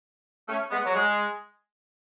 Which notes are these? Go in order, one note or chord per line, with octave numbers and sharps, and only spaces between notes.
A3 C#4
G#3 B3
F#3
G#3